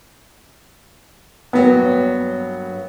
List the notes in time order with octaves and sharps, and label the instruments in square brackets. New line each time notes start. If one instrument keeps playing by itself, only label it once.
[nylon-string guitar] G2 F#3 A#3 [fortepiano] B3